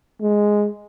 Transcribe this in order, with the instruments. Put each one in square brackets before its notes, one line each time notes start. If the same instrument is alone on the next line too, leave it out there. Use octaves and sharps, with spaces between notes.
[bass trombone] G#3